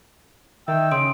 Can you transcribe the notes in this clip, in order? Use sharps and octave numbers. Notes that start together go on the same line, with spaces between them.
D#3 E5 G5 E6
C#3 C6 D#6 D7